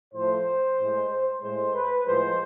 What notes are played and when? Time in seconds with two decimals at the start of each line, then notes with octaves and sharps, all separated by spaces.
0.13 A2 F3 A3 C5
0.77 A2 G#3
1.09 C5
1.41 A2 G#3 C5
1.74 B4
2.06 A2 F3 G#3 C5